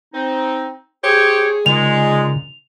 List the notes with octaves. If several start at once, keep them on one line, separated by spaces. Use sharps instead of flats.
C4 D#4
G4 G#4 C5 C#5
A#2 C#3 G#3 D#4 F4 F7